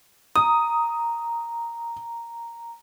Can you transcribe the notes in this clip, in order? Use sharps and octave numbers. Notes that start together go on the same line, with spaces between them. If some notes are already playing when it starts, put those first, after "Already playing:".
A#5 D#6